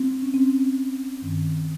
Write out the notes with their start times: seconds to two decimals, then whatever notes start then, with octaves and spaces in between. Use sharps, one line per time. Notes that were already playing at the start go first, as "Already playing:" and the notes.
Already playing: C4
0.22 C#4
0.34 C4
1.22 G2 D#3